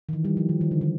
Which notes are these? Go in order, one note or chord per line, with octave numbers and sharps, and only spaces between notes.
D#3
E3
G3
F3
D#3
D#3
D3
D#3